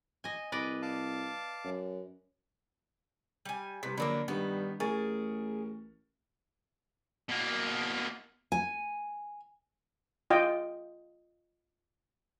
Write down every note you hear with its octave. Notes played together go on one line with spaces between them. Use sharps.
D#5 G#5
C2 B4 D5 D#5
F5 A5 D6
F#2
G3 G#5
C3 G3 B4 B6
A#1 D3 F#3 A#3 A#4 D5 B5
G2 D#3 G3 B3
A1 G#4 A#4 C#6 A6
B2 A#3
G#5
F4 D#5 G5